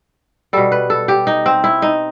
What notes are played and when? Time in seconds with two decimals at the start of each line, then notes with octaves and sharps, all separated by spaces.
0.53 B2 G3 A4
0.72 B4
0.90 A4
1.08 G4
1.27 D#4
1.46 C4
1.64 E4
1.82 D#4